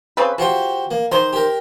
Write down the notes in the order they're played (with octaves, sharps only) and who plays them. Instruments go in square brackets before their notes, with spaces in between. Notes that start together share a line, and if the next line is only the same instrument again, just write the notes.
[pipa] C#3 C4 B4
[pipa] F3 [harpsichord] F#4 G4 C5
[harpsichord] A#3
[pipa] D#3 C5 [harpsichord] A#5 C6
[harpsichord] G4 A#4